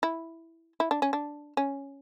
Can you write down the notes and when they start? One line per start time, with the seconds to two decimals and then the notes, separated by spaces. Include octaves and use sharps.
0.03 E4
0.80 E4
0.91 D4
1.02 C#4
1.13 D4
1.57 C#4